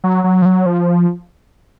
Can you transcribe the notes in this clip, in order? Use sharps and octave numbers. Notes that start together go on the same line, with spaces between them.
F#3
F#3
F3
F#3
F3